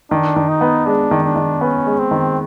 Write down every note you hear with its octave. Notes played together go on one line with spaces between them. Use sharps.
D#3 D4
D#3
D#4
B3
G#3 D4
D#3
D4
D#3
B3 C#4
G#3
C4
D#3